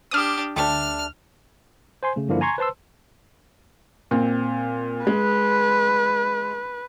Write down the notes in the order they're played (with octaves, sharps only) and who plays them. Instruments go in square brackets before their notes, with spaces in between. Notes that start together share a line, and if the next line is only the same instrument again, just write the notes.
[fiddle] D4 G4 [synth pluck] D#6 F6
[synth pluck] D2 [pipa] G3 A3 D4 [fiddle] F6
[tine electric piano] C5 G#5 C6
C#3 A3
G2 D3 F3 A#3 D4 E4
G#5 A#5 C6 C#6 G#6
B4 C5 A5 C6 E6
[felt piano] A#2 C4
[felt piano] G#3 [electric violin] B4